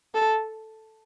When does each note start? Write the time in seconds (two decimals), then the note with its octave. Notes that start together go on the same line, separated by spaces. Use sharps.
0.14 A4